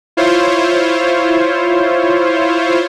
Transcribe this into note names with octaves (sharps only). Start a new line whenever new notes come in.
E4 F4 C5 C#5